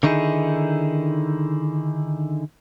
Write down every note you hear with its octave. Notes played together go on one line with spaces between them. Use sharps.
D3 D#3 D#4 E4 G#4